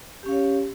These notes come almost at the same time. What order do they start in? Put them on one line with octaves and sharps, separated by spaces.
G4 C#4 F5 C#5